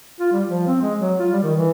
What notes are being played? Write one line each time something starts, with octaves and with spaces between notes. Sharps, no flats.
F4
G3
F3
C4
G#3
F#3
F4
G3
D#3
E3